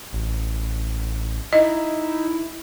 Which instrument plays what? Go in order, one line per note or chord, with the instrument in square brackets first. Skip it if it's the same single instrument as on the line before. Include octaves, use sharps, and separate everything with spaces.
[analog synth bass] A1
[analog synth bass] D#4 [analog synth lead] E4 [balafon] D#5